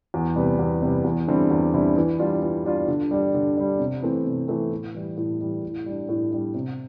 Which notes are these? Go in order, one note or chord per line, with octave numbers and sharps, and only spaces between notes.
E2
C3 G3 B3
E2
C3 G3 B3
E2
D3 G3 C4 E4
E2
D3 G3 C4 E4
E3
G3 D4 F4
E3
G3 D4 F4
D3
G3 D4
D3
G3 D4
C3
E3 A3 C4
C3
E3 A3 C4
A2
E3 G3
A2
E3 G3
A2
G3 D4
A2
G3 D4
C3